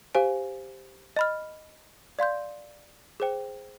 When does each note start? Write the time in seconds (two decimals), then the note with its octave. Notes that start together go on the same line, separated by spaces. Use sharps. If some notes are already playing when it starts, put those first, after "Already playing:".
0.15 G4 C5 F5 G#5
1.16 D#5 B5 F6
2.19 D5 F5 C6 G6
3.20 G#4 C5 G5